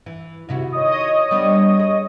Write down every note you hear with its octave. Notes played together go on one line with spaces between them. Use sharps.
E3
C3 D#3 E4 F#4
C#5 D#5 D#6
G3 B3 D4
G#4